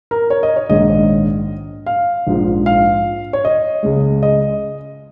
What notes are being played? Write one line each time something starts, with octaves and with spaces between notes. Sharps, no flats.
A#4
C#5
D#5
C#5
A#1 G#2 D#3 G#3 D#5
F5
A#1 G#2 F3
F5
C#5
D#5
C#2 C#3 G#3
D#5